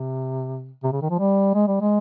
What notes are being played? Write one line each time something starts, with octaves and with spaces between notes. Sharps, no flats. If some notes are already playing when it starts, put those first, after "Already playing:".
Already playing: C3
C3
C#3
D#3
F3
G3
G#3
G3
G#3